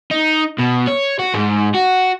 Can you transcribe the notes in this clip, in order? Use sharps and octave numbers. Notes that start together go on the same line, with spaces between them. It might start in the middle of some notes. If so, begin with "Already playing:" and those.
D#4
B2
C#5
F#4
G#2
F#4